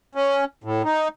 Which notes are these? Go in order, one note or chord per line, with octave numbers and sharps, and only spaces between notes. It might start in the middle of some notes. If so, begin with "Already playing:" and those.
C#4
A2
D#4